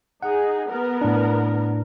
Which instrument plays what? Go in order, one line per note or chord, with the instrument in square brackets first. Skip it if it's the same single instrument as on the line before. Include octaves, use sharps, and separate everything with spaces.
[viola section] D#4 G#4 [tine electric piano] F#5
[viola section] B3 A#4
[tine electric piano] A2 D4